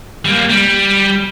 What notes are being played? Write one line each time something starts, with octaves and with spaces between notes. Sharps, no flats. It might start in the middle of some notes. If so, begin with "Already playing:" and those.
G3 A#3
G3